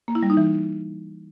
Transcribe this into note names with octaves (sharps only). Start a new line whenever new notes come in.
A#3
E4
G3
D#4
E3